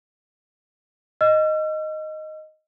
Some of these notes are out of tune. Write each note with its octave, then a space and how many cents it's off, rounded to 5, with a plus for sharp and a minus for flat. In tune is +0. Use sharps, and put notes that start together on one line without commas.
D#5 +0 E6 +45